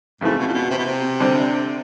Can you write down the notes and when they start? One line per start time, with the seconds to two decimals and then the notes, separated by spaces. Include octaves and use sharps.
0.21 F2 G#2 C#3 E3 A3
0.38 B2
0.47 A#2
0.53 B2
0.70 C3
0.78 B2
0.85 C3
1.20 D3 G3 C4